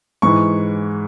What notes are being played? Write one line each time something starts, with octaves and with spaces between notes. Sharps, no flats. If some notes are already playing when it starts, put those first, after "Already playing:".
G#2 E3 C#6